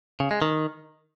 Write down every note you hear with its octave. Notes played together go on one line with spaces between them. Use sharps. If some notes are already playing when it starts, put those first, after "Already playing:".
C#3
G#3
D#3